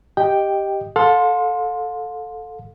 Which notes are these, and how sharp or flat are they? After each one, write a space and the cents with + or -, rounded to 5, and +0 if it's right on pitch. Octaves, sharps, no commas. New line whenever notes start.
G4 +0 D#5 +0 G5 +0
A4 +0 F5 +40 C6 +0